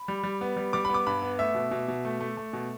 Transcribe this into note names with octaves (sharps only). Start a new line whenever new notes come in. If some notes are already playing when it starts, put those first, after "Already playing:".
Already playing: B5
G3
G3
B3
G3
G3 D6
B3 B5
D6
G2 B5
B3
A3 E5
B2
B2
B2
A3
A3
A3
B2